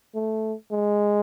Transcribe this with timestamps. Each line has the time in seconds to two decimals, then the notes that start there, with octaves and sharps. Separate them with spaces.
0.15 A3
0.71 G#3